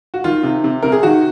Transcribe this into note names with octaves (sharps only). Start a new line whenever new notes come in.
F#4
D#3 F4
C3
C3
C3 A#4
G#4
D#3 F#4